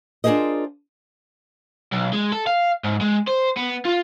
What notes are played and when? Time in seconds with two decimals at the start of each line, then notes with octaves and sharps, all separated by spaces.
0.24 D4 F4 G#4 A#4 C5 D#5
1.92 B1
2.13 G#3
2.32 A4
2.47 F5
2.84 G#2
3.01 G#3
3.27 C5
3.57 B3
3.85 F4